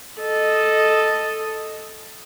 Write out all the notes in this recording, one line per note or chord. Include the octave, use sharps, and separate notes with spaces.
A4 D#5